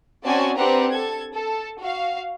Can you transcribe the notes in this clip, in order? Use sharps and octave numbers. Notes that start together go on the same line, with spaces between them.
C4 C#4 F#4 D5 G#5 A5
C4 D4 G4 B4 F#5 A#5
A4 G#6
A4
F#4 F5